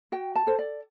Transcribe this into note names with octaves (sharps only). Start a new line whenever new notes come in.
F#4 G5
A5
A4 C5
D5